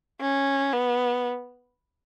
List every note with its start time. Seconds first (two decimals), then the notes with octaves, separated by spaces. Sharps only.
0.21 C#4
0.73 B3